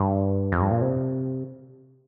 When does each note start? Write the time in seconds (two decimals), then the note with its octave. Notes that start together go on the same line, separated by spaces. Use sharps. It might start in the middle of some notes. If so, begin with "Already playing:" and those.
Already playing: G2
0.52 F2
0.62 G2
0.71 A#2
0.81 C3